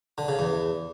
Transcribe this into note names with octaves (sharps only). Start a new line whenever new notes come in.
D3
C#3
E2